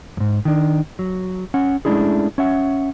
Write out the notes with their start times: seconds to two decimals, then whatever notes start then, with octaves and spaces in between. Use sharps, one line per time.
0.17 F2 G#2
0.45 D#3 D4
0.99 F#3
1.54 C#4 F#5
1.85 G#3 A3 C#4 D4 E4 G#4
2.38 C#4 E5 F#5